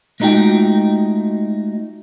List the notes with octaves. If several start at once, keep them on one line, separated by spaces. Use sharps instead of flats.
G#3 A3 D#4 F4 F#4 G5